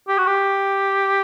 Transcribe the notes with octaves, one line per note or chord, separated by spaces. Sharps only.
G4
F#4
G4